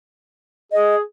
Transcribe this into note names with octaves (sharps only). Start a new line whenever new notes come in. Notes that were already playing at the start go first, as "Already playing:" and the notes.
G#4 D#5